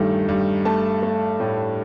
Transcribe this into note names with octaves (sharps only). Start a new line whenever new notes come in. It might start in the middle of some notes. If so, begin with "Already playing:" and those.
Already playing: G2 D#3 A3
G2
A3 A5
A3
A2